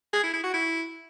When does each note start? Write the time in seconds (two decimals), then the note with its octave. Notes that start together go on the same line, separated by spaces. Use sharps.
0.13 G#4
0.23 E4
0.33 E4
0.44 F#4
0.54 E4